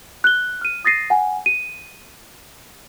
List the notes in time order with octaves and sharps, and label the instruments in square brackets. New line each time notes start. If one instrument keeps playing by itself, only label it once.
[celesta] F#6 G7
F6 D#7
D#6 A6 A#6 C7 D#7
F#5 G#5
D#7